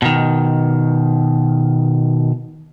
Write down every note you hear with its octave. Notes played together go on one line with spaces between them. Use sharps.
B2 D#3